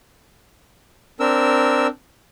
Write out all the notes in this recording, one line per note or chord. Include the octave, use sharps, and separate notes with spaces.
C4 D4 A#4 E6